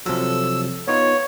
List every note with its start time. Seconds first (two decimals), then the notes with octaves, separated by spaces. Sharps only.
0.06 C3 F3 F#3 A4 E6
0.88 B3 D#4 F4 C#5